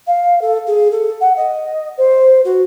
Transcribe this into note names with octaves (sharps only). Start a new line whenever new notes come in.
F5
A4
G#4
A4
F#5
D#5
C5
F#4